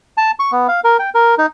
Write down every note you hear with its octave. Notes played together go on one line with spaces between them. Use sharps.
A5
C#6
B3
F5
A#4
G5
A#4
D#4